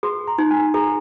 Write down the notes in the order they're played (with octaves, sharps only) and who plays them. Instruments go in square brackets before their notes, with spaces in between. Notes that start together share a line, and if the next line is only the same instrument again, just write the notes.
[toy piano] G#4 [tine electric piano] C6
[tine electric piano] A#5
[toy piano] D#4
[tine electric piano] G#5
[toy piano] G#4 [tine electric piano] A#5